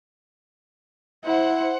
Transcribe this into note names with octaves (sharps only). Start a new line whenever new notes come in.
E4 C5 F#5